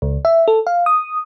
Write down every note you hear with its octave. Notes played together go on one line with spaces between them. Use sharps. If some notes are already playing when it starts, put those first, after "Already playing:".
C#2
E5
A4
F5
D#6